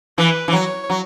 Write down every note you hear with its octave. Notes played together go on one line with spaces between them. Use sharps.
E3 B4
E3
F#3 C#5
F#3